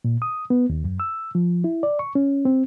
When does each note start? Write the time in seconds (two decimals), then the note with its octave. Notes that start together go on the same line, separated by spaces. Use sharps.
0.04 A#2
0.22 D#6
0.50 B3
0.70 D#2
0.84 F#2
1.00 E6
1.35 F3
1.64 E4
1.83 D5
1.99 C#6
2.15 C#4
2.45 C4